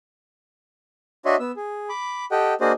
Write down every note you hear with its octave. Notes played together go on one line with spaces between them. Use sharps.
D4 F#4 C#5 D#5 E5 C6
B3 E6
G#4
B5 D6
G4 A4 D#5 F#5 G5
A#3 D4 F#4 G#4 C5 D#5